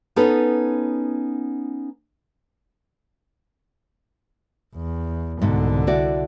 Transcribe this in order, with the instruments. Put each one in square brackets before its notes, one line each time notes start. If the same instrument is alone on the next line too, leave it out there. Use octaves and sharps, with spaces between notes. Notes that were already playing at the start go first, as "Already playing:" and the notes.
[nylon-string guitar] B3 C#4 D#4 A4 B4 C#5
[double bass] E2
[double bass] C2 D3 [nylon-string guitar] G#2 B2
[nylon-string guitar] E4 F#4 D5